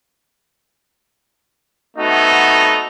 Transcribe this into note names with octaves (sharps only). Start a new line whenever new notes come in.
A3 B3 C4 D#4 F#4 A4